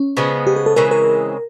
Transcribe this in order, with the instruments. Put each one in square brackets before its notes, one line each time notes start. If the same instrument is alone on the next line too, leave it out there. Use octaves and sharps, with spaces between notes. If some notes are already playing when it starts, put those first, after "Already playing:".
Already playing: [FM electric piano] C#4
[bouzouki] C#3 F3 G#3 B3
[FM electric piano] G4
G#4
A4
[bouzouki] C#3 E3 G#3 C4 [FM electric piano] A#4
[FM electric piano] A#4